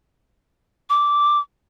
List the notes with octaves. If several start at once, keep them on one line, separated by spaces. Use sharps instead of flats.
D6